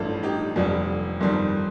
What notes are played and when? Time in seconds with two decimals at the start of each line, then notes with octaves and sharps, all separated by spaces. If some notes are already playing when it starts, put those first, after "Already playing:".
Already playing: A1 G2 F3 F4 A4
0.23 D#4 G4
0.56 F1 F2 D3 G3
1.20 G1 F2 D#3 G3